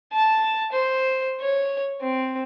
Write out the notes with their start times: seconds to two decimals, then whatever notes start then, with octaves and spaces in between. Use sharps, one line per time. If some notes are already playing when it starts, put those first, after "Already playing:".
0.12 A5
0.72 C5
1.41 C#5
2.01 C4